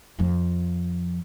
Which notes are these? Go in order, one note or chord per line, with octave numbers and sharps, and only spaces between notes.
F2 F3